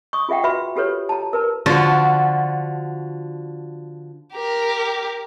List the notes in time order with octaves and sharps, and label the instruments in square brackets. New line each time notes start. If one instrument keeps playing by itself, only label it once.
[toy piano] C#6 D#6
F4 G#4 E5 F#5 G5
F#4 B4 E5 B5
F4 G4 A4 B4 C#5
A5 A#5
A#4 B4 A5
[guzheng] D3 F3 F4 F#4
[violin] G4 A#4